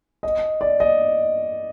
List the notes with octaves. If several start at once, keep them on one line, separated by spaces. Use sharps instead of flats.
D#5
D5
D#5